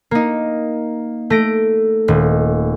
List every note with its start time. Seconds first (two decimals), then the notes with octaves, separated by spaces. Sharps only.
0.11 A#3 D#4
1.30 A3 A#6 D7
2.08 D#1